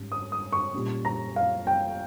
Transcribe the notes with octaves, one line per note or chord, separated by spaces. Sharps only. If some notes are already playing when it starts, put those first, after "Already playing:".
Already playing: G#2 G3 C#4
D#6
D#6
C#6
A#2 G3 C#4
A#5
F5
G5